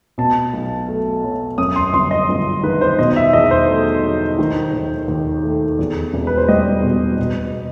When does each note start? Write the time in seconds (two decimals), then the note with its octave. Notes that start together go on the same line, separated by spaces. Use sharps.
0.18 B2 A5
0.54 B1
0.88 A3
1.24 F#3
1.58 F#2 D#6
1.76 C6
1.93 G1 C6
2.11 D#5
2.29 G1
2.63 D#3 B4
2.81 C5
2.99 B2 D#5
3.16 E5
3.33 E2 D#5
3.51 C5
3.68 A3
4.04 F#3
4.39 D#3
4.73 D#2
5.08 D#2
5.43 A3
5.79 E2
6.14 E1
6.27 B4
6.37 C5
6.48 G3 D#5
6.83 B2
7.18 B2